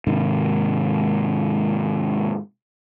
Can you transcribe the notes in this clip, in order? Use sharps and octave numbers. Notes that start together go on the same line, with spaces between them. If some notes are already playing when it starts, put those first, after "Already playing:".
G#2 C3 D#3